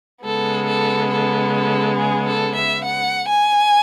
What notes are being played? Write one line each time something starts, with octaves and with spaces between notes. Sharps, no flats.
C#3 G#3 B3 A4
A4
A4
A4
G#4
A4
E5
F#5
G#5